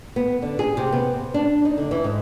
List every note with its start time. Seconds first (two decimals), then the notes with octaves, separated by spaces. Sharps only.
0.16 B3
0.42 D3
0.59 G#4
0.77 C3
0.92 B3
1.13 C3
1.34 D4
1.65 D#4
1.78 D3
1.91 E3
2.04 G#2